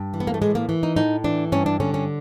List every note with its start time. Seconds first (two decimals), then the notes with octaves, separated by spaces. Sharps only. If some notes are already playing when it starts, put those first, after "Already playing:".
Already playing: G2
0.14 E3
0.20 B3
0.27 A#3
0.34 A3
0.42 A2 G#3
0.55 A#3
0.69 E3
0.83 D#4
0.96 A2 D#4
1.24 E3 D4
1.52 G2 C#4
1.66 D4
1.80 D3 C#4
1.94 C#4